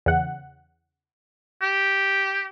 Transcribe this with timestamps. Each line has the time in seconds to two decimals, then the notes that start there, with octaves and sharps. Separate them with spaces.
0.06 E2 C#3 F#5
1.62 G4